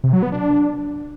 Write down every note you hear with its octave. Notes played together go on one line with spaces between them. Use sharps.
C3
F#3
B3
D4